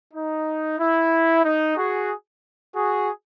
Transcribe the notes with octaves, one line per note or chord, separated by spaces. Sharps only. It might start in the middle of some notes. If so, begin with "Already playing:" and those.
D#4
E4
D#4
F#4 G#4
F#4 G#4